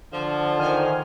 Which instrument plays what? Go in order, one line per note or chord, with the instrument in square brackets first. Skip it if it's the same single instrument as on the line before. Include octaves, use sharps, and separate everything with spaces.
[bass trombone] D3 [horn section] F3
[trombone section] D#3 [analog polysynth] C5 G#5 F6